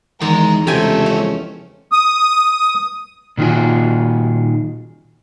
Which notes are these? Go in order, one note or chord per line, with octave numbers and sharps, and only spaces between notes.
E2 D#3 G#3 A#5 C6
C#2 C3 F3 A3 G4 G5 G#5
C#4
D#6
A#2 D#3 F4 F#4 G#4